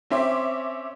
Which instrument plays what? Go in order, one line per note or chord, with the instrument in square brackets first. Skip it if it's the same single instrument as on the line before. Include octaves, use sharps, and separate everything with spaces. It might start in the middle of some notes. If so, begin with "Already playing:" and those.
[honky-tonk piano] C4 C#4 E5 C6 D6